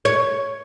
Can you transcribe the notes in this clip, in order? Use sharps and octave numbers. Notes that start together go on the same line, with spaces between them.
C#5